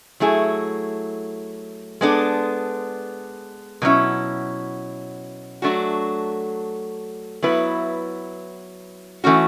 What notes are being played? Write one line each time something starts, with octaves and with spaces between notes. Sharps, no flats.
F#3 A3 E4 G#4
G#3 B3 D4 A4
B2 F#3 C#4 E4
F#3 A3 D4 F#4
F#3 B3 E4 B4
E3 A3 C#4 F#4